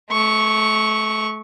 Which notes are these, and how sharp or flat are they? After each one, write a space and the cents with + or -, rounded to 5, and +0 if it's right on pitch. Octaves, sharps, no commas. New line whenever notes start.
A3 -30 C#6 +0